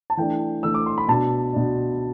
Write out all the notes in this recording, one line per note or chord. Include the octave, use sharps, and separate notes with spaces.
A5
E3 A3 D4 G5
E3 A3 D4 E6
D6
C6
B5
B2 B3 D4 A5
B2 B3 D4